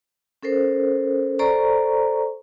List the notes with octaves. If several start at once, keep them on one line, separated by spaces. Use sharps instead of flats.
C#4 A4 A#4 C5
A4 C5 D5 A#5 C#6